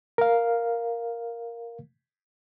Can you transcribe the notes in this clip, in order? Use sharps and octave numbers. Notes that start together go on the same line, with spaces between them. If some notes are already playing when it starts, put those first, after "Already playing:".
A#4 F5